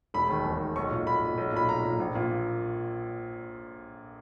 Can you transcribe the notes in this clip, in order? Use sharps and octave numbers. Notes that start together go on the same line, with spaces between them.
E1 B5
D#2 D#3
E1
D#2 D#3
B1 C#6
A#2
B1 B5
A#2
B1
A#2 B5
B1 A#5
A#2
A#1
A#2